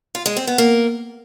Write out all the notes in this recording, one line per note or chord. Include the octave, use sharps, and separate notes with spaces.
F4
G#3
C4
B3
A#3